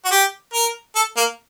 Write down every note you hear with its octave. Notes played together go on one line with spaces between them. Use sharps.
F#4
G4
A#4
A4
A#3